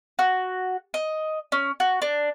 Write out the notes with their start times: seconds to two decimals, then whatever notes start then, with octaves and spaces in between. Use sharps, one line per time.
0.19 F#4
0.94 D#5
1.52 C#4
1.80 F#4
2.02 D4